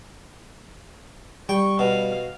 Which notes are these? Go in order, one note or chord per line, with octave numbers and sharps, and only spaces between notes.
G3 G5 C#6
B2 F5